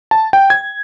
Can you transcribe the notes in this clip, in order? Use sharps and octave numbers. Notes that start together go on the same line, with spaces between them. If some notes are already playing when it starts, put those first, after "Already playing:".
A5
G5
G#6